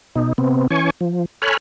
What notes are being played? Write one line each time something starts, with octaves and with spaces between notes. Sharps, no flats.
B2 D#4
C3 B3 C4
E3 C#4 G#5 C#6
F3
A4 C#5 G#5 B5 F6 F#6